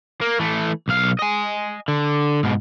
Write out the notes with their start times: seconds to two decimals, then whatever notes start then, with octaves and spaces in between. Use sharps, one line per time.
0.21 A#3
0.40 E3 A3
0.88 B1 F5
1.19 D#5 G#5
1.88 D3
2.43 G#2 B2